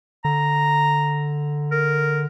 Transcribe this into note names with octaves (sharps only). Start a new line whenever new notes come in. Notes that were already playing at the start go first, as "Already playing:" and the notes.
D3 A#5
A#4